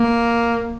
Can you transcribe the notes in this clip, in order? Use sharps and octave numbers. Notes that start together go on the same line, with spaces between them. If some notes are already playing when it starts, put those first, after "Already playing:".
Already playing: A#3